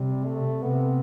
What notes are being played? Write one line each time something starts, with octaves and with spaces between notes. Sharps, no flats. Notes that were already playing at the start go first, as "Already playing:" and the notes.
Already playing: C3 G3
A3
C3 B3